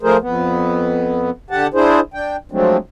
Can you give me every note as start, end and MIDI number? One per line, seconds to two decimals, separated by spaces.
0.03 0.17 53
0.03 0.17 57
0.03 0.17 68
0.03 0.17 70
0.03 0.17 72
0.21 1.30 41
0.21 1.30 59
1.50 1.67 50
1.50 1.67 67
1.50 1.67 78
1.50 1.67 81
1.74 2.00 62
1.74 2.00 64
1.74 2.00 68
1.74 2.00 72
2.14 2.37 62
2.14 2.37 79
2.51 2.77 53
2.51 2.77 54
2.51 2.77 56
2.51 2.77 57
2.51 2.77 60
2.51 2.77 62